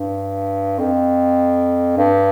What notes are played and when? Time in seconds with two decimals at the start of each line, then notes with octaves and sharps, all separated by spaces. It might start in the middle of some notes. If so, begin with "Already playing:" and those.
Already playing: G2
0.79 F2
1.97 G2